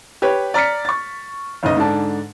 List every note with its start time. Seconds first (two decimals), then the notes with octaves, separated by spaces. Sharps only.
0.22 G4 B4 C#5
0.54 D5 A#5 F6 B6 C#7
0.85 C#6 A6
1.63 F#1 B1 D#5
1.77 G#2 D3 D4 A5